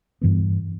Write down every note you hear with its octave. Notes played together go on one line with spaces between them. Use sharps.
G2 E3 B3